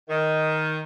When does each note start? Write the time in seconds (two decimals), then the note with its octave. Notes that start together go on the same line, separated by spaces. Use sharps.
0.10 D#3